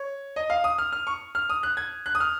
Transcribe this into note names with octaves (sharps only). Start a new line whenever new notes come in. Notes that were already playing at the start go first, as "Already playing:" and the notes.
Already playing: C#5
D#5
F5
D#6
F6
F6
C#6
F6
D#6
F#6
G#6
F#6
D#6
F6